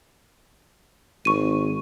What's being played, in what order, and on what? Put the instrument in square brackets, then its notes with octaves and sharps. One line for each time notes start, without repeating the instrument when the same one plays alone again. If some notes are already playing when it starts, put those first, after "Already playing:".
[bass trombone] G#1 [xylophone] C#6 D#7